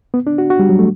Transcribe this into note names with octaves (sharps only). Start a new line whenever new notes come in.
B3
D4
F#4
F#4
G3
F#3
A3